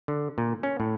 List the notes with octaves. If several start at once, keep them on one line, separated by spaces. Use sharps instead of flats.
D3
A#2
C#4
A2